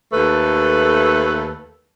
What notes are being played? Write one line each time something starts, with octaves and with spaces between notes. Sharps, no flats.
D#2 A3 A4 B4